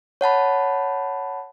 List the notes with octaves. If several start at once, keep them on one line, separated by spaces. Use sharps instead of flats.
C#5 F#5 A5 B5